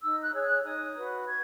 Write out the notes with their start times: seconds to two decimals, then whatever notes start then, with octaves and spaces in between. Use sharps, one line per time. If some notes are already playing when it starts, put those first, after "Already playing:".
0.01 D#4 E6
0.22 F#6
0.32 G#4 C#5
0.43 F#6
0.63 D#4 D#6
0.96 F#4 B4
1.27 F#4 G#6